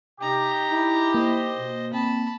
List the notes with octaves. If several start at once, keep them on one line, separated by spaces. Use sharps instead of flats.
C3 D#4 G4 A#5
E4
A#3 C5 D#5
B2
C4 A5 B5